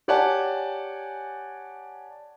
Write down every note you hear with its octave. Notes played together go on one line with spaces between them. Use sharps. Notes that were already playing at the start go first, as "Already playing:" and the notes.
G4 C#5 D5 F#5 G#5 A5